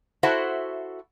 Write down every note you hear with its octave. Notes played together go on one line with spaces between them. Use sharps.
E4 F#4 A4 C5 E5 F#5